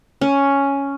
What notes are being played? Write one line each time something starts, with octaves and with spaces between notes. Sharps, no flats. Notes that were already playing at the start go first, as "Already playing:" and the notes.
C#4